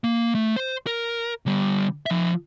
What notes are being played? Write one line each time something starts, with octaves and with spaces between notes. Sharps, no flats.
A#3
A3
C5
A#4
D3 G3
F3 E5